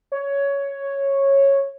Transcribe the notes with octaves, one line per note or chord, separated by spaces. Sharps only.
C#5